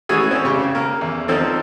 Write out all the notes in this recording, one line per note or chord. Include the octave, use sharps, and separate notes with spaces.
E3 A3 C#4 F#4 G#4
C4 C#4
C#3 G4 C#6
A#3
E2
F3 C4 D#4 A4